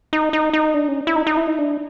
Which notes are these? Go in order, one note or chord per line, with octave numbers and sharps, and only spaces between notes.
D#4
D#4
D#4
D4
C#4
E4
D#4
D#4
E4
D#4
D4